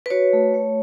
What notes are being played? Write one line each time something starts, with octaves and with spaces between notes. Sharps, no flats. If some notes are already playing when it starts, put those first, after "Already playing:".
B4
F#4 C#5
A3
A3